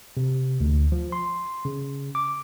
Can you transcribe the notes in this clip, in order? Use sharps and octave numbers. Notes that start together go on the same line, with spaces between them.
C3
D2
F3
C6
C#3
D6